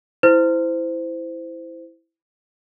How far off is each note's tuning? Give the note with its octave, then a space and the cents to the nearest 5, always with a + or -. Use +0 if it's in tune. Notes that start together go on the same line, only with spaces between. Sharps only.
E4 +0 C5 -20